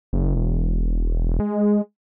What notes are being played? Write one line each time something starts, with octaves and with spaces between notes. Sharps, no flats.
F#1
E1
G#3